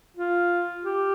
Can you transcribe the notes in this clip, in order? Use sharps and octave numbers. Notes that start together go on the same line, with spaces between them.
F4
G4